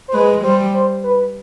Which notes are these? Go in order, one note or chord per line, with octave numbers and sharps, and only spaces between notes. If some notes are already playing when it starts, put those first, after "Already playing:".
C5
G#3 B4
G3 C5
C5
B4